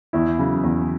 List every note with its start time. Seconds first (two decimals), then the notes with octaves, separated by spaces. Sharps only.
0.13 E2 E4
0.39 C#3 F#3
0.64 E2